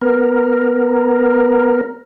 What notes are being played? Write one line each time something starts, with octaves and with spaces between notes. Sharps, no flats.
B3 A#4